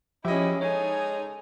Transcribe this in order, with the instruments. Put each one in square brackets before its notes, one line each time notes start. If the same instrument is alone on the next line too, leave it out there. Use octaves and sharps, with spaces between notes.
[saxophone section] E3 G#3 G4 [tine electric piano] F3 [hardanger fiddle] C#4 E4 [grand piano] D#5 E5
[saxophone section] G#3 D#4 [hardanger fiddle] A4 G#5 [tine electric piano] C#5